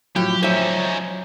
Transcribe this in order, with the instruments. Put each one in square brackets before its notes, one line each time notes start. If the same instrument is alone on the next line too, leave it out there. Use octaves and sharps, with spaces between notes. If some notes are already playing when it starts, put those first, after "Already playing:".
[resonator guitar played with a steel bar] A2 [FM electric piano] F3 F#3 [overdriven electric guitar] G4
[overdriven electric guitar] C#4 D#4 [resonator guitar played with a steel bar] C5 E5